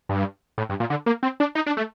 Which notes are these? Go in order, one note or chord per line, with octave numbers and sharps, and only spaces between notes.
G2
A2
G2
A#2
D3
A#3
C4
D4
D#4
D4
A3